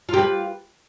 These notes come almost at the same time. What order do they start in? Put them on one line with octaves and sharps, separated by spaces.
F4 G4 B4